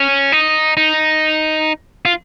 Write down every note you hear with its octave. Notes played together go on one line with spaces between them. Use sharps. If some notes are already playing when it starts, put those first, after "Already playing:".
Already playing: C#4
D#4
D#4
F4